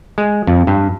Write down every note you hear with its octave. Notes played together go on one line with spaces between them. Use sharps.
G#3
F2
G2